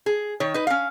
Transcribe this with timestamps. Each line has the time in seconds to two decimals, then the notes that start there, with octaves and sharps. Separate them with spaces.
0.06 G#4
0.40 D#3 C#5
0.54 D#4 B4
0.67 C#4 F5